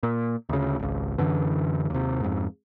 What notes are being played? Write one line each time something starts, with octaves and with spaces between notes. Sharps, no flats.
A#2
D2 C#3
G#1 C#2
F#2 D3 E3
D#2 C3
F2 G#2